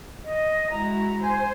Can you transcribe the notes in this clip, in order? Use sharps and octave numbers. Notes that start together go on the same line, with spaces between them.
D#5
G#3 E4 F#4 A#5
C5 G#5